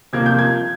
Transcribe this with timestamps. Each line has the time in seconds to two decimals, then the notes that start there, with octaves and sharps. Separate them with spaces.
0.13 C3 F3 A#3 G#6
0.26 G6
0.39 G#6